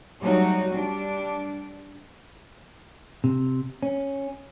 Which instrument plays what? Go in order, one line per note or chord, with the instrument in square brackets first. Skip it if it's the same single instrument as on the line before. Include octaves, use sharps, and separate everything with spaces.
[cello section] F#3 G3 A3 D#4 F#4 C#5
G3 D4
[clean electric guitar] C3
C#4